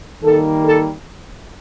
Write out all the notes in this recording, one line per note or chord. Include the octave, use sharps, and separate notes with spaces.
D#3 G3 A#3 A4
A4